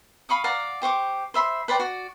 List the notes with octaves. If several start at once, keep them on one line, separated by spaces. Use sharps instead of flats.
F5 B5 C#6 D#6
D5 F5 F#5 A#5
G4 C5 C#6 D6
C5 E5 B5 C6
B4 C5 D5 G5
F#4 D5